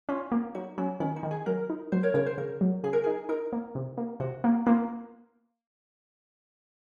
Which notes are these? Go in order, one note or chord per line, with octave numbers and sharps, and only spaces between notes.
C#4 F4
A#3
F#3 D#4
F#3 C#4
D#3 C#4
D#4
D#3
G#4
F#3 A#4
D#4
F#3 C5
A#4 C#5
C#3 A#4 C#5
C5
C#3 A#4
F#3
C#3 G#4
A#4
G#4
D#4
D#4 A#4
A#3
C3
A#3
C3 F#4
A#3
A#3 F4